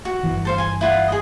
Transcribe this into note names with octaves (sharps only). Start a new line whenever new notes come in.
F#4
G1 E3
A4 C5 F5
G#5 C6
E4 F4 F#5
G#4 D#5